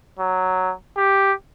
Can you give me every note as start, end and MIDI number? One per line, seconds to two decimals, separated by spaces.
0.19 0.73 54
0.97 1.33 67